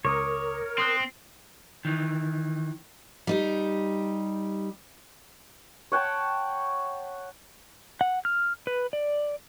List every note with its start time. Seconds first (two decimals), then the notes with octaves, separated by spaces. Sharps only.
0.05 C#2 A#4 C#5 D6 D#6
0.78 C4 C6 D#6 F#6
1.85 D#3 E3
3.27 G3 D#4 G4
5.92 C#5 F#5 G5 A5
8.01 F#5
8.25 F6
8.67 B4
8.93 D5